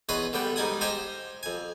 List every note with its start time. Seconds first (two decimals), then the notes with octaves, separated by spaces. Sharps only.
0.09 E2 C#4 B4 D#5 C6 D#6
0.33 D3 G3 B3 G5
0.56 G#2 G3 D#4 G#5 D#6
0.81 G4 C5 D#5 G#5 A#5 C6
1.43 F2 G#5